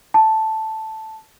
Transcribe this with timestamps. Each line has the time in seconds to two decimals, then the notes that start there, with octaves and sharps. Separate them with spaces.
0.14 A5